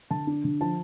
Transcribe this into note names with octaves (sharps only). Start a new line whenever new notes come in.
D3 A5
D4
D3
F3 A5